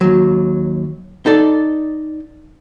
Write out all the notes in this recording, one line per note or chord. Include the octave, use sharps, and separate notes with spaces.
D#2 F#3
D#4 A4 D5